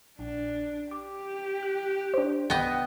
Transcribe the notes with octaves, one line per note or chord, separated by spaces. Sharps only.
A#1 D4
G4 D6
F#6
D4 C5
C2 B3 D#5 G5 D#6